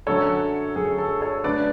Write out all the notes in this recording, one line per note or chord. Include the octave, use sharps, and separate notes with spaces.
F#2 D3 F#3 A4 C#5
F#2 D3 F#3 G#4
A4
A4 C#5
F#2 D3 A3 D4 B4 D5